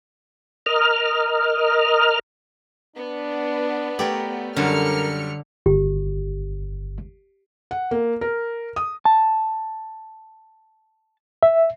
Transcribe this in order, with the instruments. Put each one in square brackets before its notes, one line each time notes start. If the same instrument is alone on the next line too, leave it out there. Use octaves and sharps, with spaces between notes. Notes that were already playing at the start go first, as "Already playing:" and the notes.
[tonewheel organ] A#4 D#5 F6
[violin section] B3 [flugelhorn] D4
[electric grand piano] A3 G4 G5 [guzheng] A#4 C#5 D5
[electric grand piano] F#2 G3 C#4 [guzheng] D3 C#5 [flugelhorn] A#4 [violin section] F6 C#7
[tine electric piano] G1 [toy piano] G4
[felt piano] F#5
A#3
A#4
D#6
[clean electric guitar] A5
[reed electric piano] E5